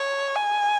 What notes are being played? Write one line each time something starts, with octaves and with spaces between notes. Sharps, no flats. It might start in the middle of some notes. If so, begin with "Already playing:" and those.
Already playing: C#5
G#5